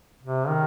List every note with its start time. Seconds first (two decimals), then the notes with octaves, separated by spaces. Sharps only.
0.23 C3
0.48 D#3